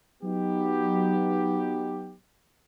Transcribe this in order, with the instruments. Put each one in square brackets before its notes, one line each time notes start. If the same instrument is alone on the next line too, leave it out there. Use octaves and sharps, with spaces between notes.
[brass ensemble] F#3 B3 D#4 G4